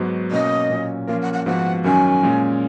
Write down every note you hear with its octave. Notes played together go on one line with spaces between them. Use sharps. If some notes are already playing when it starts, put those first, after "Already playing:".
Already playing: G#2 F#3 B3 D#4 F#4
B2 A#3 C#4 F#4 D#5
A#2 F#3 C#4
F3 A#3 C#4 F4 A#4 F5
F#5
F#5
G#2 F3 B3 F#4 F#5
F#2 D#3 F#3 C#4 F#4 G#5
A#2 G#3 C#4